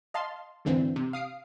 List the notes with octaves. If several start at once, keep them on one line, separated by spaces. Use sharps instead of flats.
D#5 F5 A5 C6
E2 G#2 D3 E3 C4
C3
F5 D#6 C7 D7